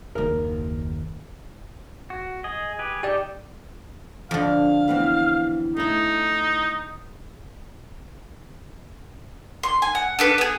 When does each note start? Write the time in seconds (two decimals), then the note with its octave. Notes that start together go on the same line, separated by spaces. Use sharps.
0.15 F#1 D#2 A#4
2.10 F#4
2.44 G#4 D#5
2.79 G4 G#4 B4
3.03 D#4 G4 A4 D5 G5
4.31 F2 D3 F5
4.88 E3 B3 C4
5.77 A3 D#4 E4
9.63 C6
9.82 G#5
9.95 F#5
10.19 D4 A4 B4
10.38 B3 G#4